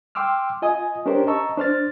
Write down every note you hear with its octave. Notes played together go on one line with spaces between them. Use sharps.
G5 C6 D6 E6 F6
F4 D#5 G#5 D#6
C#4 D4 G4 A#4 C5
D#5 A5 A#5 C#6 E6
D4 C5 F6 A6